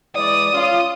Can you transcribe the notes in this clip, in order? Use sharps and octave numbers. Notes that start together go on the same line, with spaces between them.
E3 G#3 D5 D#6
C#4 F4